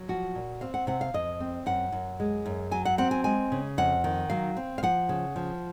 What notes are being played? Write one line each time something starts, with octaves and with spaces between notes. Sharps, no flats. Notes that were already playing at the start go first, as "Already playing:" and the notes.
Already playing: F#3
F3 F#4
A#2
C4 F5
F#5
C3 F#5
F5
F2 D#5
C4
F#2 F#5
F#2
G#3
F#2
F#3 G#5
F#5
C4 F#5
G#5
G#3 G#5
C#3
F2 F#5
D#3
F#3 F5
C4
F5
F3 F#5
C#3
F3